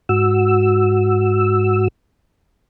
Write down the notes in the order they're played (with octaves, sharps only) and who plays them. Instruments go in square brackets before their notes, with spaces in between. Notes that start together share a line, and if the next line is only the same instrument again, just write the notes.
[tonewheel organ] G#2 F#4 E6